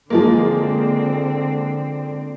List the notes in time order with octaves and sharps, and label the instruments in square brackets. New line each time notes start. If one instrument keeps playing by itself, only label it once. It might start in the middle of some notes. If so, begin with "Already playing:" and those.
[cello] D3 C4 [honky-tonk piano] F3 G#3 A#3